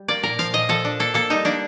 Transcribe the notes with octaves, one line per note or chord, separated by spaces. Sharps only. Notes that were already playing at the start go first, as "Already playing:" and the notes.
Already playing: G3
A#3 D5
A#2 A#4
F3 F5
A#2 D#5
F3 A4
D4
A#3 A4
A#3 A4
G3 D#4
A#3 D4